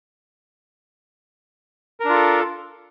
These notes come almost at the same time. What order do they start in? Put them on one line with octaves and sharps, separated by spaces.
A#4 D4 F4 A4